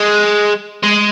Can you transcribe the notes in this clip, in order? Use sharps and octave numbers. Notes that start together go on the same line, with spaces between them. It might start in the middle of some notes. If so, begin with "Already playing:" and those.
Already playing: G#3
G#3